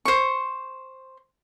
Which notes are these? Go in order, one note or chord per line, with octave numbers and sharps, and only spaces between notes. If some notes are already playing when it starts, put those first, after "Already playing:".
C5 C#6